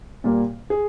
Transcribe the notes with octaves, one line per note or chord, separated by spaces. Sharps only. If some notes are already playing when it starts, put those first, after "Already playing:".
A#2 G3 A#3
G#4